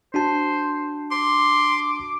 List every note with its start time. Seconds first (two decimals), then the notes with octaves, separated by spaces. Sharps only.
0.14 D4 F#4 C5 A5
1.12 C6 D6